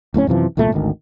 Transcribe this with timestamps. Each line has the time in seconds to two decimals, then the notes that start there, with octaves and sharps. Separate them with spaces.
0.14 D1 A2 A3 C#4
0.27 F#2 C3 E3 F3
0.57 E1 C2 A#2 A3
0.72 G#1 D2 D#3